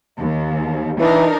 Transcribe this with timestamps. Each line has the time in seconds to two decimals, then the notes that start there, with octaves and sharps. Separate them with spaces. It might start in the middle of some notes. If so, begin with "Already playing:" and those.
0.19 D#2
1.00 E3 D4 D#4 A#4